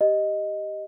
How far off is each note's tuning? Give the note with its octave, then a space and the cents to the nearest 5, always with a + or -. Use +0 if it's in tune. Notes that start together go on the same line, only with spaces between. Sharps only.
G4 +0 D#5 +0